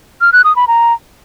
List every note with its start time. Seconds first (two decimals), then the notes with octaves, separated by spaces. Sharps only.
0.21 F6
0.33 F#6
0.44 D#6
0.56 B5
0.68 A#5